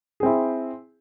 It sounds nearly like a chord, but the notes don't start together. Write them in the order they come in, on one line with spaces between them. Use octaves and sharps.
G#4 C4 E4